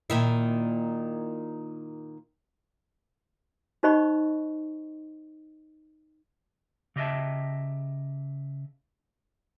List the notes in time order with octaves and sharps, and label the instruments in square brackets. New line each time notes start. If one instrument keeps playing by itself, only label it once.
[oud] A#2 D#3 E4
[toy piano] D#4 G4 C5 D#5 B5 C#6
[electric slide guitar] C#3 G4 D#5 E5 G5 A5